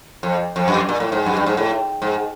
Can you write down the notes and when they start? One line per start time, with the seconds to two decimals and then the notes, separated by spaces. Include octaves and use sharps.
0.23 F2
0.56 F2
0.68 F#2
0.89 A#2
1.00 A2
1.12 G#2
1.26 F#2
1.37 G2
1.46 G#2
1.57 A2
2.02 G#2